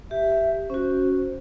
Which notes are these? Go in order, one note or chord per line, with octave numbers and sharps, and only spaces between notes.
G4 E5
C#4 F#4 C5